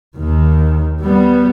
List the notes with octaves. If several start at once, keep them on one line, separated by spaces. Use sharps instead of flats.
D#2 D#3
G3 B3